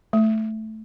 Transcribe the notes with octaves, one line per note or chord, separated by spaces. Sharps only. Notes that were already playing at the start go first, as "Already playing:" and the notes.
A3